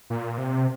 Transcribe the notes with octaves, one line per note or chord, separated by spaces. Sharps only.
A#2
C3